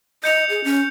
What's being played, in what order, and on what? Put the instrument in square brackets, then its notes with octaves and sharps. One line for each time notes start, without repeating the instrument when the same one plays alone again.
[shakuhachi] D#5 [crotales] G6 C#7 F7
[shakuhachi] G#4
C#4